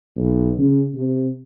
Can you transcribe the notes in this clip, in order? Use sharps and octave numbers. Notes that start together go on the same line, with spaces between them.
B1
C#3
C3